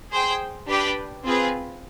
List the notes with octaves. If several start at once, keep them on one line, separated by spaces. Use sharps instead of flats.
G#4 C5 G5
D4 G4 B4 D5 G5
C4 F4 G#4 B4